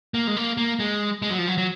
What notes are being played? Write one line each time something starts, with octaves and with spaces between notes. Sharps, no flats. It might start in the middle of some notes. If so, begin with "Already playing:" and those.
A#3
G#3
A#3
A#3
G#3
G#3
F#3
F3
F#3
F#3